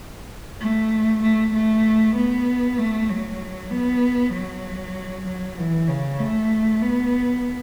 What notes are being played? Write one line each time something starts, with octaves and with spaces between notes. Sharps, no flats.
A3
A3
A3
B3
A3
F#3
B3
F#3
F#3
E3
C#3
A3
B3